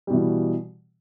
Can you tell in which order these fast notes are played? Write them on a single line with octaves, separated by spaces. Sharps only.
G3 B2 E3